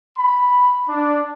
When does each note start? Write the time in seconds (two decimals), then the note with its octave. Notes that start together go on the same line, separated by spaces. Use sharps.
0.16 B5
0.89 D4